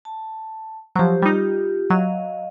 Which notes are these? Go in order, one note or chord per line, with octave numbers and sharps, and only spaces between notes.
A5
F3 F#3 G4 C5
G3 D#4 F4 G4
F#3 D#5 F5